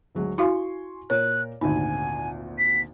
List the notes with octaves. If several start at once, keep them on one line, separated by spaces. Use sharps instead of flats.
D2 F#3 G#3
E4 F#4 F5 G#5 C6 C#6
A#2 A#4 C#5 F#6
G#1 D2 A#2 D#4 G#5
B6